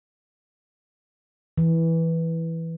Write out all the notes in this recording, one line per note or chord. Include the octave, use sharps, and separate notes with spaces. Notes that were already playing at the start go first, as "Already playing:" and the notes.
E3